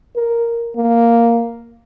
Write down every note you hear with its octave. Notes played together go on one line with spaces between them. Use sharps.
A#4
A#3